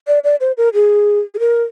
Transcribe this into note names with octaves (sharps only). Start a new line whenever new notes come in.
D5
D5
C5
A#4
G#4
G#4
A#4